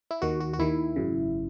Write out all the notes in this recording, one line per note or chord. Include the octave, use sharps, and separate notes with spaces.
E4
D#2 D#3 F#4
F#4
F#4
D#2 D#3 E4
G#1 F#2 C#3